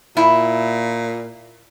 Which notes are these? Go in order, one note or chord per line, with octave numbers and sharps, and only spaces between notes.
A#2 E4